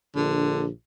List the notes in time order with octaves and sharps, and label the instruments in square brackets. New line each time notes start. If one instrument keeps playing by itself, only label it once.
[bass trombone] A#1 [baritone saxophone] D3